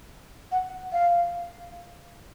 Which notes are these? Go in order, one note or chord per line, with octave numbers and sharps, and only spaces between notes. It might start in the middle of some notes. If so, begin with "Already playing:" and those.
F#5
F5